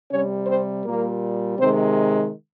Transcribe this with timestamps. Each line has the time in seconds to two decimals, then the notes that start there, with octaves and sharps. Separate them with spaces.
0.10 C3 G3 C#4 C#5
0.47 C4 C5
0.84 A#2 G3 A#3 A#4
1.58 C3 D#3 G#3 C4 C5